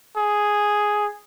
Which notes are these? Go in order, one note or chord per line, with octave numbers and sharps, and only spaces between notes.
G#4